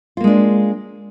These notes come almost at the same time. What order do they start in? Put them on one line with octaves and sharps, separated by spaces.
F4 A#3 G#3 D4